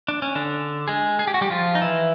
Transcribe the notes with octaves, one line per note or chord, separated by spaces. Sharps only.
D4
C#4
D3 D4
G#3 G#4
G#4
G4
F#4
G3 G4
F3 F4
D#4
E3 E4